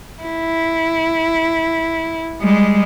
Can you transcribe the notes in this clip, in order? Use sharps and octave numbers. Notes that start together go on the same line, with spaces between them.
E4
G3 G#3